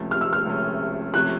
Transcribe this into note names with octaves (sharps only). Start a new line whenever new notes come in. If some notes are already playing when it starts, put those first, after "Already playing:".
Already playing: C#2 C3 F3 A3 C#4
F6
E6
F6
C#2 C3 F3 A3 C#4
C3 F3 A3 C#4 F#6